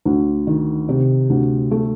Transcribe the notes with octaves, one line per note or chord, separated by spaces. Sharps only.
D2
D#3
C3
D2
A3